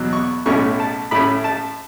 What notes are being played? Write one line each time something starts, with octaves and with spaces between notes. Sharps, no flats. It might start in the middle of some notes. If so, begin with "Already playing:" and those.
Already playing: E2 B2 F#3
C#6
B1 A2 A3 C#4 C#6
A5
A2 A3 C#4 B5
A5